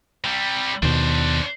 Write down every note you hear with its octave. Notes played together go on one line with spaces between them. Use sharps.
C3 G3
D#2 B2 D4 C5